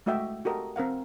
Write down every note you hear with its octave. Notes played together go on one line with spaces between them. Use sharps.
G#3 A3 F#4 D#5 E5 G5
F#4 G4 A4 A#4 D#5
C4 A#4 F5 F#5